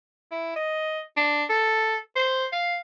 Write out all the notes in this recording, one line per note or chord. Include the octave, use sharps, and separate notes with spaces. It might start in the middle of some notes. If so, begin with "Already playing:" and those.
E4
D#5
D4
A4
C5
F5